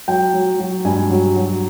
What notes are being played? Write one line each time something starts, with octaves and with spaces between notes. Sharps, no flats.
F#3 G5
F#3
F#3
G2 G#5
F#3
F#3